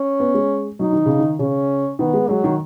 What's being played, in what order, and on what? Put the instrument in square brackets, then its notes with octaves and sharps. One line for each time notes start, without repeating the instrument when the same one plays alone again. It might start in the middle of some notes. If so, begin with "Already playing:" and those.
Already playing: [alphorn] C#4
[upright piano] B3
G#3
[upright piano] F#3 [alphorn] D#4
[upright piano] D#3
C#3
D#3
[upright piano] C#3 [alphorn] C#4
[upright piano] D#3 [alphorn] B3
[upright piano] G#3
[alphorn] F#3 [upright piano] G#3
[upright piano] D#3